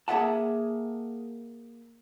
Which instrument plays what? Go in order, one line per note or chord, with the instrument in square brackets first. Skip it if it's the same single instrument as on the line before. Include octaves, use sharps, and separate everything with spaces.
[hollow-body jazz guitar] A#3 G#4 A4 E5 F#5 A5